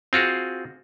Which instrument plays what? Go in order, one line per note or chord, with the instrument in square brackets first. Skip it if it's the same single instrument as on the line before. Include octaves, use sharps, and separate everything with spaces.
[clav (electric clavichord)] C4 F4 F#4 G#4